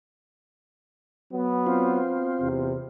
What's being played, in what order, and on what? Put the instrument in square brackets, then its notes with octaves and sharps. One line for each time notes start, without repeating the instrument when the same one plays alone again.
[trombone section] F#3 B3
[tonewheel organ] C4 F4
[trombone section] E2 C3